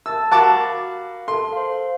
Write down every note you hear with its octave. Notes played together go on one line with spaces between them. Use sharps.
A5 E6 A6
F#4 A#4 F5 A5 B5 D6
A4 C6
C5 F5